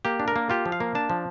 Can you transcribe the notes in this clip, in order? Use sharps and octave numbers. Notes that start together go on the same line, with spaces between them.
A#3 G4
D4
A#4
A#3
F4 G4
F3
F5
A#3
D4 A5
F3